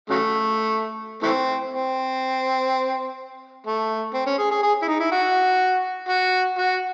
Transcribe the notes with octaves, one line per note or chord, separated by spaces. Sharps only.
C#3 F#3 A3
E3 A3 C4
C4
A3
C4
C#4
G#4
G#4
G#4
E4
D#4
E4
F#4
F#4
F#4